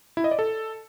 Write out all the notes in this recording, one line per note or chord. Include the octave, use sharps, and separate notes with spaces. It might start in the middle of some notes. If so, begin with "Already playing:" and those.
E4
D#5
D5
A4